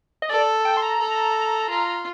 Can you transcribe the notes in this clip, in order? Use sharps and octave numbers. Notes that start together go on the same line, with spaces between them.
D#5
A4 D5
G5
C6
A#5
A4
F4